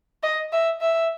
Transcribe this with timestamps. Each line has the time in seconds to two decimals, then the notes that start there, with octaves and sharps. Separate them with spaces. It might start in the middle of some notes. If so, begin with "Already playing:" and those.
0.23 D#5
0.52 E5
0.81 E5